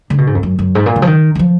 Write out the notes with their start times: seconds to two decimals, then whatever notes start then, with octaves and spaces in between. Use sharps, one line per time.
0.10 D3
0.18 B2
0.27 G#2
0.35 F2
0.43 F#2
0.59 F#2
0.75 G#2
0.86 A#2
0.96 D3
1.02 F3
1.07 D#3
1.35 D#3
1.39 F3